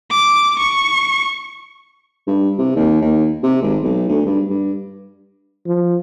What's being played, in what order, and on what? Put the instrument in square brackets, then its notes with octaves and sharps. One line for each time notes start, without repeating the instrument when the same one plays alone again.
[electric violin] D6
C#6
[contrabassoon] G2
C3
D#2
D#2
C3
G#1
B1
D2
G2
G2
[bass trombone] F3